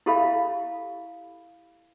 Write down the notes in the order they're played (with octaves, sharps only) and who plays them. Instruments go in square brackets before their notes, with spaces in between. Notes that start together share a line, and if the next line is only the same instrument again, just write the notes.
[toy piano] E4 G4 A4 E5 F5 B5